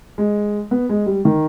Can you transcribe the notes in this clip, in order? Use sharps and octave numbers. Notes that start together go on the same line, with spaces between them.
G#3
B3
G#3
G3
D#3